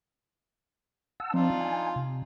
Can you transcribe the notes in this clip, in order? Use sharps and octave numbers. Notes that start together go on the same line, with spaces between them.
F#5 A5 E6
F3 C4 D4 D#4 F4
G#5
C3